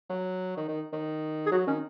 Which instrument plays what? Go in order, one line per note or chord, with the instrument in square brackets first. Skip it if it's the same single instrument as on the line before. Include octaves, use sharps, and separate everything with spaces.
[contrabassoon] F#3
D#3
D#3
D#3
[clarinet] G#4
[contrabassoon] F#3 [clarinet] F#4
[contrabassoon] D#3 [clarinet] C#4